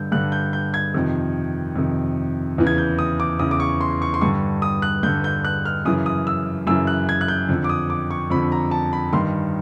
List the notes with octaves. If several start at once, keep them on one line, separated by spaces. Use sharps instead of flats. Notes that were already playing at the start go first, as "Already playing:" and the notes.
Already playing: G2 D3 G6
G2 D3 F#6
G6
G6
G#6
F2 C3 D#3
F2 C3 D#3
E2 C#3 E3
G#6
G6
D#6
D6
E2 C#3 E3 D#6
D6
C#6
C6
C#6
C6
G2 D3 C#6
D#6
F#6
G2 D3 G6
G6
F#6
F6
F#2 C#3 E3 D#6
D#6
E6
F#2 C#3 E3 E6
F#6
G#6
F#6
G6
F2 D3
D6
D#6
D6
C#6
F2 D3 B5
A#5
A5
B5
G2 D#3 C6